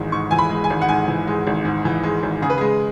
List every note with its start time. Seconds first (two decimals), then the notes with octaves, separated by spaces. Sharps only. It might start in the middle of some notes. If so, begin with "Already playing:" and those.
Already playing: G#1 G#2 E3 G#3
0.12 G#2 C#6
0.31 E3 G#5
0.38 B5
0.50 G#3
0.64 G#5
0.70 G#1
0.81 F#5
0.89 G#2 G#5
1.08 E3
1.27 G#3
1.47 G#1
1.65 G#2
1.85 E3
2.03 G#3
2.23 G#1
2.42 C#3 G#4
2.50 B4
2.58 G#3 G#4